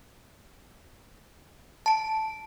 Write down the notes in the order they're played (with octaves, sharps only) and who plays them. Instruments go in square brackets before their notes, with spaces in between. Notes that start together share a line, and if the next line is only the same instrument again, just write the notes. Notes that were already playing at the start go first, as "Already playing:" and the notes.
[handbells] A5 D7